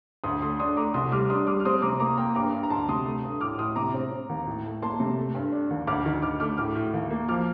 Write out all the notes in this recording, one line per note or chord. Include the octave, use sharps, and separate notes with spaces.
D2 C6 D#6
A3 C6 D#6
D4 C6 D#6
A3 A#5 D6
C2 C6 D#6
G3 D6 F6
D4 C6 D#6
G3 D6 F6
F6
C4 C6 D#6
C3 A#5 D6
A#3 A#5 D6
A#3 G5 A#5
G2 A#5 D6
G2
A#5
D2 A5 C6
C3 C6 D#6
A3
G2
A2 D6 F6
A2 C6 D#6
C3 A#5 D6
C4
C4
D#2
A2
A3
A#3 A5 C6
C3
A3
G2
D4
D#2
D2 D6 F6
D#3
D2 D6 F6
A3 D6 F6
A2 D6 F6
A2
D#2
A#3
F3 D6 F6